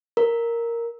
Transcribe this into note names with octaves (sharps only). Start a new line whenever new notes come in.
A#4